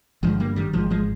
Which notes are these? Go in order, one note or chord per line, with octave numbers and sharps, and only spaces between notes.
G1 G2 D3 F3 G#3
G3 A#3
D#3 G3
G#1 G#2 F3 G#3
F3 G#3